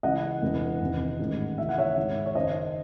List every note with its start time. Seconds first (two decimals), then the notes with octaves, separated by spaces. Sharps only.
0.03 C#2 C#3 E3 D#5 F#5
0.42 E1 E2 C3 E3
0.81 E1 E2 C3 D#3
1.19 A1 G#2 D#3
1.58 D#2 C#3 E3 E5
1.69 F#5
1.78 C#5 E5
1.97 G#1 G#2 D#3
2.26 C#5
2.35 F#1 F#2 D#3 C5 D#5